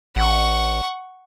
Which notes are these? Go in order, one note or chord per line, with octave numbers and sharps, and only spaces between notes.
A1 F#5 C#6